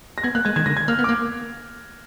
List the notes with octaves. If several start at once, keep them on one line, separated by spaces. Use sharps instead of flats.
A#6
B3 G#6
A#3 F#6
G#3 G#6
D#3 G#6
D3 A#6
G#6
A#3 F6
B3
D6
A#3